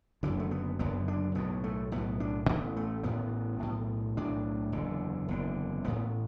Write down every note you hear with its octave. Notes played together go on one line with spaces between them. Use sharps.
F#1 F#2 D3 E3
A3
B3
F#1 F#2 D3 B3
D4
B1 A2 B3
A3
B1 A2 B3
D4
A1 A2 B3
A3
A1 A2 B3
B1 A2
B1 A2 D4
F#1 E2 D3
F#1 E2 D3
A1 A2 B3